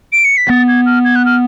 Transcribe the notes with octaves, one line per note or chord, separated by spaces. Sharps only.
D7
C#7
B6
B3 A6
G#6
F6
G#6
F#6
F6